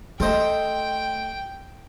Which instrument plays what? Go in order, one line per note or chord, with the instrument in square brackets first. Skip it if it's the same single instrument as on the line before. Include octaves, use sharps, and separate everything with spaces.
[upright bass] A3 [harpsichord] A4 C5 D#5 [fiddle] G5